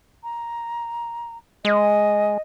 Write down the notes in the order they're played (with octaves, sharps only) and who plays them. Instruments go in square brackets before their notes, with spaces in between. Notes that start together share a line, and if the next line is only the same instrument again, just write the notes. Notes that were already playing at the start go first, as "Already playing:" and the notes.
[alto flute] A#5
[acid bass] G#3 [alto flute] D#5